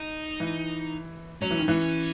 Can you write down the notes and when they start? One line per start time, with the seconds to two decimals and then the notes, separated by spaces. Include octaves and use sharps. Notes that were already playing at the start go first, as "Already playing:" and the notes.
Already playing: D#4
0.40 E3
1.42 F#3 C#4
1.50 E3
1.59 D#3
1.68 E3